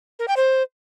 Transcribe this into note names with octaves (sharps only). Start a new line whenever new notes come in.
A#4
G5
C5